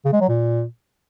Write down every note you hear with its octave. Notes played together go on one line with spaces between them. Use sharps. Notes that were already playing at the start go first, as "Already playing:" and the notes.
C#3
G#3
F#3
A#2